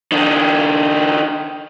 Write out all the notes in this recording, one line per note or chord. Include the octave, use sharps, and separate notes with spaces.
D#3 D4